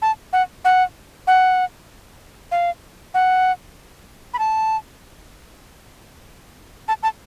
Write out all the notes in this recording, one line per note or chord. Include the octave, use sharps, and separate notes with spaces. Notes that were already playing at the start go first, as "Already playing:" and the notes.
A5
F#5
F#5
F#5
F5
F#5
B5
A5
A5
A5